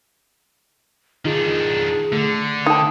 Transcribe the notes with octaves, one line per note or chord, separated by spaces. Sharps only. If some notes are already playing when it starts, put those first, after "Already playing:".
D#3 D4 D#4 F4 G#4
D3 A3
D#4 G5 A5